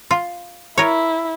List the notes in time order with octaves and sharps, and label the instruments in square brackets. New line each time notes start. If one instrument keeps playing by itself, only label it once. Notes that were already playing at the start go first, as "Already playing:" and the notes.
[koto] F4
[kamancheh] E4 [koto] A#4 C#5